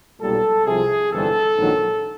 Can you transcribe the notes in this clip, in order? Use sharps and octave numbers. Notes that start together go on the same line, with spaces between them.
B1 A#2 G3 A4
C2 C3 F3 G#4
G1 F2 C3 E3 G3 A4
A#1 G#2 D#3 F#3